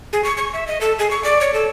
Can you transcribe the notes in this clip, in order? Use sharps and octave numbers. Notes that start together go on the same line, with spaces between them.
G#4
C#6
C#6
E5
D#5
A4
G#4
C#6
D5
C#5
A4